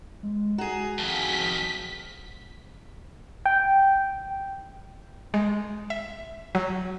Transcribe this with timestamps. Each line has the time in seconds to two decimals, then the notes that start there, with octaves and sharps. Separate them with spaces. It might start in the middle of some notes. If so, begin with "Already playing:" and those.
0.23 G#3
0.58 F#4 G#4 A#5
0.98 F2 D#3 A5 B6
1.39 F3
3.46 G5
5.34 G#3
5.90 E5
6.55 F#3